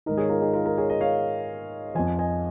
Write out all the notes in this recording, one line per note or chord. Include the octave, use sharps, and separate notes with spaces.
G#2 D#3 A#4 D#5
G#4 C#5
F4 A#4
D#4 G#4
F4 A#4
F4 A#4
G#4 C#5
A#4 D#5
C#5 F5
F2 F3 D#5 G#5
D#5 G#5